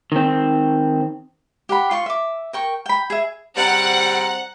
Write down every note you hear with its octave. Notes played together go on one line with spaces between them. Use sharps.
D#3 C4
G4 F#5 B5
F4 C6 C#6
E5 D6
A#4 G5 C#6
G5 B5
G#4 E5
G3 C4 F#5 A#5